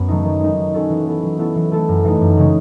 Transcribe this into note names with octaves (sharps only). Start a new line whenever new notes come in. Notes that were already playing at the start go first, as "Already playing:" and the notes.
Already playing: F#2 B3 C#4
D#3 F#3 A3 D#4
D#3
G#3 D#4
F#3
C#4 F#4 A4
E3
B3 E4 A4
F#3
B3 E4 A4
E3
A3 E4 A4
F#2
E3 A3 D#4
F#2
C#3 G#3 C#4